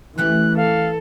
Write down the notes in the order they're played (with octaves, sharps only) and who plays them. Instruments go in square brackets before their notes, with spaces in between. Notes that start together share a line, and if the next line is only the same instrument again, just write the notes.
[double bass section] E3 [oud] A3 C#4 G4 [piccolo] F#6
[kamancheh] A4 [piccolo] F5